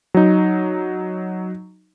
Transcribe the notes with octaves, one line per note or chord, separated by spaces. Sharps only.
F#3 D#4